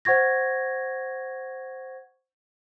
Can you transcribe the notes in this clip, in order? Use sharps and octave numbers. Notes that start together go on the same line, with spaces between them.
C5 F#5 C#6 G#6 A#6